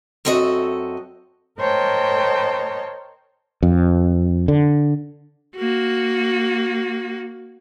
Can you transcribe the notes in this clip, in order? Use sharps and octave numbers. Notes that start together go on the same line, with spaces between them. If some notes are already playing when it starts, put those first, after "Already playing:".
F#2 C4 F#4 A4 D#5 E5
A#4 C5 C#5 D#5 G5 A5
F2
D3
A#3 F#4